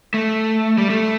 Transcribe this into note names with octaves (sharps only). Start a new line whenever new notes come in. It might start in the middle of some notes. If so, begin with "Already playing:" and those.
A3
G3
A3